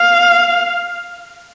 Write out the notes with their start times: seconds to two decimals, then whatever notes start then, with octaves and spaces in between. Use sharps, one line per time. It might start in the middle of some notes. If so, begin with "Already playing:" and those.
Already playing: F5